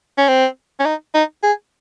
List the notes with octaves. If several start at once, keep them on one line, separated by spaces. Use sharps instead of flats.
C#4
C4
C#4
D#4
D#4
G#4